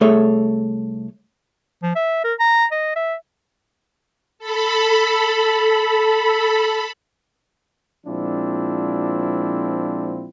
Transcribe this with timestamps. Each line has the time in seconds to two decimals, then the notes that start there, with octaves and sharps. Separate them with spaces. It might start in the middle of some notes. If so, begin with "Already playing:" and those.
0.01 C2 A3 G#4 A4 C#5 E5
1.83 F3
1.96 E5
2.24 A#4
2.39 A#5
2.71 D#5
2.96 E5
4.39 A4 B5
8.06 A#2 F3 G#3 C4 D4 E4